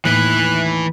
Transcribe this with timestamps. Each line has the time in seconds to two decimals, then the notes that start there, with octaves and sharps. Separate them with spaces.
0.05 D#2 A2 E3 B4 F#6